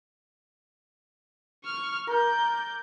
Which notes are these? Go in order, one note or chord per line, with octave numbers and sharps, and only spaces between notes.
C#6 F6
A#4 D5 G6